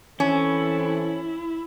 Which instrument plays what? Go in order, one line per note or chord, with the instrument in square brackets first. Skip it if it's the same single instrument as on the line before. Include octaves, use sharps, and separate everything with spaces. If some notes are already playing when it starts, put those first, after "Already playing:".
[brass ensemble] E3 C4 A4 [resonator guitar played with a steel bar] C#4 [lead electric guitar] E4